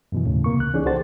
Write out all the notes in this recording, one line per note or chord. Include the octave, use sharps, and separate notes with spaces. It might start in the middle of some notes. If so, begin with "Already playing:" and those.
F#2 B2 E3
D#2 A2 C#3
C3 A#3 C#6
C#2 F#6
E3 C#4 D#4 G#4 D5
C2 G4 A4 C5 F#5 A6